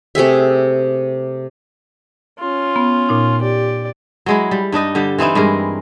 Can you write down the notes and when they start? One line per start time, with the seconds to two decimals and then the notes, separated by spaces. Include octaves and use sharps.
0.15 C3 A3 G#4 E5
2.39 C#4 F4
2.76 B3
3.09 A#2 D#4
3.42 G4 D5
4.26 F#3 G#3 E4
4.51 G3
4.72 G2 D4 D#4 D#5
4.95 D3 G3 G4
5.18 E3 C4 D#4 E4
5.35 G2 G#3 A#4